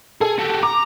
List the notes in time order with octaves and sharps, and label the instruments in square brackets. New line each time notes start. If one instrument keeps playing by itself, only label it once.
[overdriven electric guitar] G#4 [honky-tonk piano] A4
[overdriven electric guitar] F#4 G4
[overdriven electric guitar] A#5 [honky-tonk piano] D6